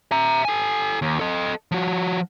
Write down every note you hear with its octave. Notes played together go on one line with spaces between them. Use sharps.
E5 A#5
A4 G#5
D#2
A4 D#5
F3 F#4